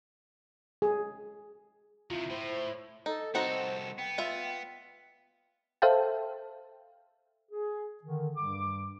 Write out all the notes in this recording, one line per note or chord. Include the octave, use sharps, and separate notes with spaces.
G#4
C3 D#3 E4 F4
A2 C5
D#4 A4
C2 C4 D#4 F#4 A4 C5
B3 G5
F4 E5
A4 C5 E5 F5 G5 A5
G#4
D3 D#3
G2 G3 D6